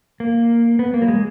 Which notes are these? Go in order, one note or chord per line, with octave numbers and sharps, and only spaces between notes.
A#3
B3
A#3
F#3
G#3